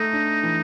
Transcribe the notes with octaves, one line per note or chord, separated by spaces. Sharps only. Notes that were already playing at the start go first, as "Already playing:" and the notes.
Already playing: A3 D#4
D4
E3